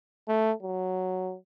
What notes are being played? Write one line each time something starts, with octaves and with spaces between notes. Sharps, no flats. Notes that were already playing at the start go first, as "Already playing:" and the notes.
A3
F#3